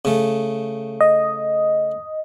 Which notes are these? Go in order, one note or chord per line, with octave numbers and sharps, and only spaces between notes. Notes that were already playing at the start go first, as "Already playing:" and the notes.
C#3 A3
D#5